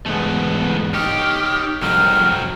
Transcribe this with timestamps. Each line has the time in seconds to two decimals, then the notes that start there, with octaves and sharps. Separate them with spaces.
0.06 E2 G#2 A3 B3
0.94 D#4 G4 C#5 F6
1.82 C2 F2 F#3 C4 F6